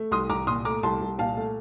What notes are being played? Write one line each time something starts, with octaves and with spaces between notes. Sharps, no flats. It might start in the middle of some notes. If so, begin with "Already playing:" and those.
Already playing: A3
C2 C6 D#6
C2 A#5 D6
A#2 C6 D#6
A3 A#5 D6
C2 A5 C6
C2
A#2 F5 A5
A3